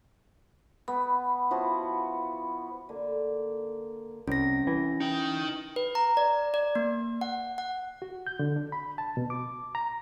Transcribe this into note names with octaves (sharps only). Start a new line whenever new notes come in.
B3 B5
F3 E4 F#4
D3 A#3
C2 C#4 A#6
E3
D#4 G5
B4
A#5
D5
D5
A#3
F#5
F#5
F#4
G6
D3
D4
B5
A5
B2
D6
A#5